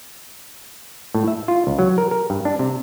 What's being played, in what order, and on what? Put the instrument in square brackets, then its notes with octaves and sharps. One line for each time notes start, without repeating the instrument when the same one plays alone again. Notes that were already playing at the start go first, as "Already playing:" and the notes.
[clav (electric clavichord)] A2
E5
F4
C#2
F#3
A#4
A#4
G2
D4
C3